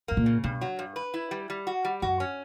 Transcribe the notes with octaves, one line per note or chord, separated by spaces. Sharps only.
G2 A#3
A#2
C#3
G2 B2
F#3
G2
B4
E4
G3
G3
F#4
G3
F#2 F#4
C#4